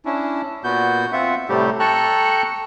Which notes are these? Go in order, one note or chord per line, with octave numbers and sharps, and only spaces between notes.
C#4 D4 E4
A#2 B3 F#4 G6
C4 F4 E5 F#5
A2 C3 G3 A3 C4 G4
A4 G5 A5 A#5 C#6 F#6